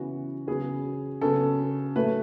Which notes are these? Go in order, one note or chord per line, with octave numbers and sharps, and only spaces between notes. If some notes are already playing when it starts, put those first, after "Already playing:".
Already playing: C#3 E3 B3 F#4
C#3 F#3 B3 G#4
C#3 F#3 B3 A4
A2 F#3 A3 B4